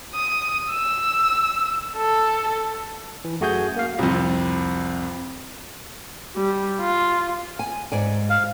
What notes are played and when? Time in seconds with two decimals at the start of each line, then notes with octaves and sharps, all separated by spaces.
0.13 D#6
0.70 E6
1.96 A4
2.49 A4
3.25 E3
3.40 F#2 A3 F#4 G#4 G#5 G6
3.76 A#3 F5
3.99 C2 F2
6.36 G3
6.81 F4
7.59 G#5
7.92 G#2 D5 G#5
8.30 F5